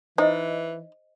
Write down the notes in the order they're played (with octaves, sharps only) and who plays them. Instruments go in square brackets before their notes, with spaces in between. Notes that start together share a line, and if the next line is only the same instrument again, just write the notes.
[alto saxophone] E3 [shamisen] D#4 [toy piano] C5 D#5